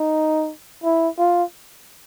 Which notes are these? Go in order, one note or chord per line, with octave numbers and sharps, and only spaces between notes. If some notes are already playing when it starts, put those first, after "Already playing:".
Already playing: D#4
E4
F4